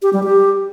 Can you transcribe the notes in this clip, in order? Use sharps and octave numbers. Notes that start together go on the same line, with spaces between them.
G4
G3
G4